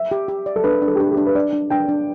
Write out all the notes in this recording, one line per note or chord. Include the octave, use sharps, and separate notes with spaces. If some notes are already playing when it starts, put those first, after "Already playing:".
Already playing: E5
G4
G4
D5
A4
D4 B4
D4
A4
G4
D4 A4
G4
D4
B4
D4 D5
D4
D4 G5
D4